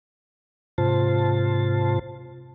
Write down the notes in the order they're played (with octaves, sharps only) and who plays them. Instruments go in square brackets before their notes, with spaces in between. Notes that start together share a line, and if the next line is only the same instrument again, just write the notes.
[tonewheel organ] G#2 C3 F4 C5 A5